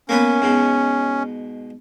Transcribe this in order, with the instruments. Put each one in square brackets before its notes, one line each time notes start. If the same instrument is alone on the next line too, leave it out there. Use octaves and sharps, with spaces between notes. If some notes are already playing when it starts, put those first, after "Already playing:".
[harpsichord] A#3 B3 B4 [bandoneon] C#4
[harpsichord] G#2 B2